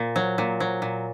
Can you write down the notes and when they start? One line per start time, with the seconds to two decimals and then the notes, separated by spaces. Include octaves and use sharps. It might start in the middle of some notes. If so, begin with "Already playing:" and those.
Already playing: A#2
0.16 F#3
0.38 A#2
0.60 F#3
0.82 A#2